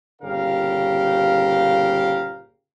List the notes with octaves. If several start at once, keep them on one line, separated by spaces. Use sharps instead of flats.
G1 A#2 C#3 G4 A#4 F5